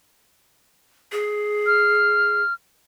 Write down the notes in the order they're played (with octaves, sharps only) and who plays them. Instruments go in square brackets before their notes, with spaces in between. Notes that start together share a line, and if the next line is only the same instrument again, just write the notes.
[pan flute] G#4
[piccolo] F6